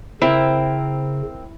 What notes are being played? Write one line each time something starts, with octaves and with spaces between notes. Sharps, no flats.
C#3 C4 E4 A#4